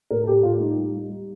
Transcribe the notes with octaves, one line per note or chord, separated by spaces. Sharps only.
A2 A#4
A4
A2 G4
A2 F4
G3 D#4
G3
G3
G3